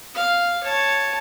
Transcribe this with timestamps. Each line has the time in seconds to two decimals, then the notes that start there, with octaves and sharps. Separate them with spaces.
0.15 F5
0.64 C#5 A5